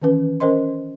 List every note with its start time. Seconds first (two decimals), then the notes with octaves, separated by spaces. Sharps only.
0.02 D#3 E3 C#4 B4
0.40 C#4 A#4 C5 D#5 C6